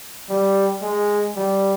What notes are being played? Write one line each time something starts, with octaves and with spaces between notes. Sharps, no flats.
G3
G#3
G3